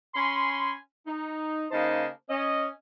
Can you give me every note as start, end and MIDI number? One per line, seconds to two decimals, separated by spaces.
0.15 0.72 61
0.15 0.72 80
0.15 0.72 83
0.15 0.72 84
1.07 1.66 63
1.71 2.07 49
1.71 2.07 58
1.71 2.07 63
1.71 2.07 72
1.71 2.07 75
1.71 2.07 81
2.29 2.68 61
2.29 2.68 75